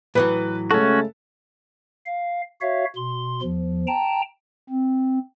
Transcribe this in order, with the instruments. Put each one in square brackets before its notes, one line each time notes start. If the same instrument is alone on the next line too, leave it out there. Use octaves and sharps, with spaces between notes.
[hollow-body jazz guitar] A2 E3 F#3 [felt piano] B4
[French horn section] C#3 G#3 A3 [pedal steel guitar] C#4 F#4 [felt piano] A4
[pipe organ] F5
F#4 C#5 E5 F5
B2 C6
E2 F3
G5 A5 A#5
C4